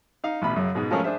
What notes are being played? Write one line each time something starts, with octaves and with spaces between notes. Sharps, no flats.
D#4 F5
A1 B2 B5
F#2 C#3
G#2 B2 G#3
F3 G#3 A3 C#4 G#4 A#4
D4 G#4 C5 E5